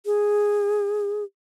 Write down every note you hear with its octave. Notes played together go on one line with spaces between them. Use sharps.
G#4